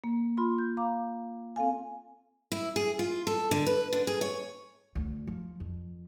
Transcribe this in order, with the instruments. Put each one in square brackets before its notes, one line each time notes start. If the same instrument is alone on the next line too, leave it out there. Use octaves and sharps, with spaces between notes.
[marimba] A#3
F4 B5 C6
G6
F5 A#5 D6
C4 A4 F5 G#5
[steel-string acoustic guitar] E4
G#4
F4
A4
D3
B4
D3
G#4
C#5
[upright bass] D2 D3
F3
F2